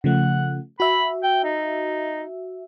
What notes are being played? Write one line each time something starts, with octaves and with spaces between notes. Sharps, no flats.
C#3 F3 A3 F#5
F#4 E5 B5
G5
D#4